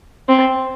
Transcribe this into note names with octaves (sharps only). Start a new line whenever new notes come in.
C4